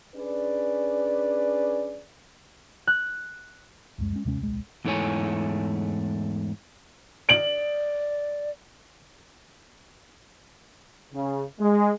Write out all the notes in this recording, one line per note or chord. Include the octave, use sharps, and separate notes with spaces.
C#4 D4 G#4 B4 D5
F#6
C#2 F#2 G#3
G#3 C#4
D#2 C3 G#3 C#4
D1 B1 G#3
E2 G#2 A3 E4 C#5 G#5
D5 D7 F#7
C#3
G#3